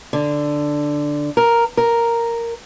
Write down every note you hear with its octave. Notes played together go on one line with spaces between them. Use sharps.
D3
A#4
A#4